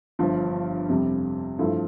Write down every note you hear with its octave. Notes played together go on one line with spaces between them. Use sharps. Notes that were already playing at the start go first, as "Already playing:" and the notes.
G1 G2 F3
F2 C3 G3
G2 F3 A3 E4